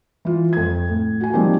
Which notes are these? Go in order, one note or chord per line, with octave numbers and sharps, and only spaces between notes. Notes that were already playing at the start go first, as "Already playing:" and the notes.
E3 F4
F2 G#6
A2
F#4 G#5
D#3 F3 G3 A#3 C4